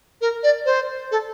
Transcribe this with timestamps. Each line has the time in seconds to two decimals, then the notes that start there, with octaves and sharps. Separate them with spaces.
0.21 A#4
0.43 D5
0.66 C5
1.11 A4